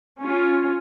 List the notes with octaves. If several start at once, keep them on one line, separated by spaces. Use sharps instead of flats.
C#4 F4